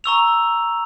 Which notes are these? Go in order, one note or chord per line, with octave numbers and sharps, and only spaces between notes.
A#5 C#6 E6 F7